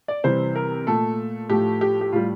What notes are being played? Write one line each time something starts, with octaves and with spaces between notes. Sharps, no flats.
D5
C3 E3 G3 C5
A#4
A#2 A3 A4
A2 F3 A3 G4
G4
G4
A2 G3 F4